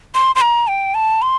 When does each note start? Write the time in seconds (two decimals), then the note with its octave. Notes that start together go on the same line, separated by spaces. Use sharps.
0.15 C6
0.36 C6
0.41 A#5
0.68 G5
0.95 A5
1.22 C6